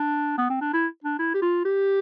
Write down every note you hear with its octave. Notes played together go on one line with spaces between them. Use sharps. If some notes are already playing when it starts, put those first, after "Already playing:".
Already playing: D4
B3
C4
D4
E4
D4
E4
G4
F4
G4